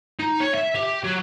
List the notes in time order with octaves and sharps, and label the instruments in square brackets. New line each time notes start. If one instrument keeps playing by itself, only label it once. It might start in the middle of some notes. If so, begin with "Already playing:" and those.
[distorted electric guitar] D#4
C#5
E5
G4
F#3